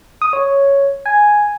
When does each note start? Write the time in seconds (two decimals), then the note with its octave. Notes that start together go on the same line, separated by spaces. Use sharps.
0.22 D#6
0.33 C#5
1.06 G#5